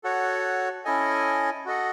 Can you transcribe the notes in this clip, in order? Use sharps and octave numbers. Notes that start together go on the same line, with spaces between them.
F#4 A4 C#5 F#5
C#4 E4 A4 D#5 G#5
F#4 A4 D#5 F#5